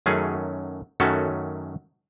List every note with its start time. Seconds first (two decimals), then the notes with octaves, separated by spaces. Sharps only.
0.06 F#2 D#3 F#3 A3 C#4 G#4
1.00 F#2 D#3 F#3 A3 C#4 F#4 A4